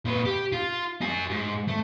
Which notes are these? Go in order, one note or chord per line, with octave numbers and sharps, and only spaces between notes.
A#2 B4
G4
F4
F#4 G#5
G#2
A3